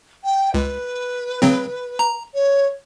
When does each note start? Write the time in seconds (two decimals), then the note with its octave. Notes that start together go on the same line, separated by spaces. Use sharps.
0.24 G5
0.54 C#2 B4
1.42 C#3 F#3 C4
1.99 A#5
2.35 C#5